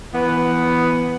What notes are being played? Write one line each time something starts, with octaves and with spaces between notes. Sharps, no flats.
E3 B3